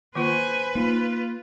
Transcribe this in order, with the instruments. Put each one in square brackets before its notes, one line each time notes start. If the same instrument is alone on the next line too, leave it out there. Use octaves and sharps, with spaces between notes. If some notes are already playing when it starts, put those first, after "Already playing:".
[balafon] D#3 A#3 F4 [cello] B4 [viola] C5 G#5
[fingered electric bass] A#3 [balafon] D#4 [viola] F4